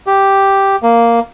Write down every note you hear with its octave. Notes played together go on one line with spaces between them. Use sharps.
G4
A#3